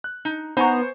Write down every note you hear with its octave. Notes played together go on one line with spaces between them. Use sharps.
F#6
D#4
B3 D#4 C5 G#5 A#5 C#6